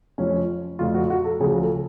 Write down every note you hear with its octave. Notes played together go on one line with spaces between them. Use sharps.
F1 F2 F3 C#4
F1 F2 F3 F4
F#4
F#4
A4
D2 C#3 F3 G#4
A4